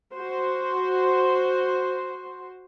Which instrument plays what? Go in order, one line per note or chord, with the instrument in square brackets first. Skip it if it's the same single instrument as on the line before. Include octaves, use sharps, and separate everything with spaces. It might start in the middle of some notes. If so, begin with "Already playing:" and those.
[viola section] F#4 C5